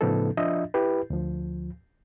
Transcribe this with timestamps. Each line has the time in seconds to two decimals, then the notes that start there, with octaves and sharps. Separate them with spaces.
0.01 A2 C#3 F3 B3 D#4 A4
0.37 F3 D4 F4 D#5 E5
0.74 E4 G4 B4
1.10 D2 F3